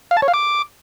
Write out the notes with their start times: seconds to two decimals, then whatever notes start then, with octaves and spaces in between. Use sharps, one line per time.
0.11 F5
0.17 A5
0.22 C#5
0.28 F5
0.34 D6